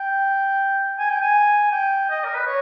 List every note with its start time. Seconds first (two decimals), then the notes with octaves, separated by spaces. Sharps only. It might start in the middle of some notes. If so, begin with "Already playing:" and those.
Already playing: G5
0.99 G#5
1.10 G5
1.21 G#5
1.72 G5
2.10 D#5
2.24 A#4
2.35 B4
2.46 C#5